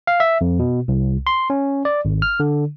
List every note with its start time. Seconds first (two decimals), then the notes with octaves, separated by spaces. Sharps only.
0.07 F5
0.20 E5
0.41 F2
0.59 B2
0.88 C2
1.27 C6
1.50 C#4
1.85 D5
2.05 G#1
2.22 F6
2.40 D3